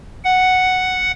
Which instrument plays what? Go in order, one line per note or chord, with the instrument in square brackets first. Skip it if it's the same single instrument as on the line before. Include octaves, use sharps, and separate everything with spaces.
[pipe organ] F#5